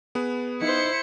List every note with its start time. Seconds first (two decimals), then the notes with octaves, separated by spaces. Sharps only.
0.15 B3 G#4 B4
0.62 D#4 E4 C5 C#7